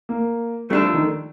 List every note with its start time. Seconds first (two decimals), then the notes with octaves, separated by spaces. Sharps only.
0.09 A#3
0.70 G3 A3 D4 A4
0.82 F3
0.94 D#3